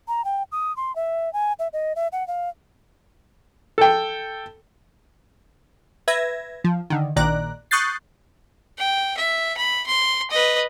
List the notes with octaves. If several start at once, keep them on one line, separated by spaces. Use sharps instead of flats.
A#5
G5
D#6
C6
E5
G#5
E5
D#5
E5
F#5
F5
A4 G5
B4 E5 G#6 A#6
F3
D3 D#3
A#1 A#2 D#3 D5 A#5 F#6
C#6 D#6 F#6 G6 A6 C7
G5
E5
B5
C6
B4 D#5